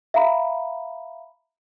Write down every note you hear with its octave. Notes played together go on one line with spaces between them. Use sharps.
E5 F5 A#5 B5